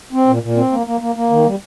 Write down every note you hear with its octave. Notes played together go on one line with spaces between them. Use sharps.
C4
A#2
A#2
C4
A#3
A#3
A#3
A#3
D#3
G3